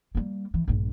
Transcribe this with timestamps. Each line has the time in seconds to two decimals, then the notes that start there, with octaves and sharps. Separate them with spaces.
0.15 G3 A#3
0.54 E3
0.68 A#1 G2